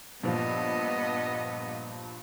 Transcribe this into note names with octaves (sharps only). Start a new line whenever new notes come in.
G2 A#2 F3 B3 D#5